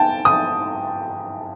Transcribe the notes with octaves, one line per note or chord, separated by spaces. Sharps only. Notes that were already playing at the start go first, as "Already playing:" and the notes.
Already playing: G5 A5
D#6